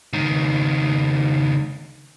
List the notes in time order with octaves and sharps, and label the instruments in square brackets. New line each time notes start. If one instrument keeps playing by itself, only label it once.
[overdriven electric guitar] C#2 D#3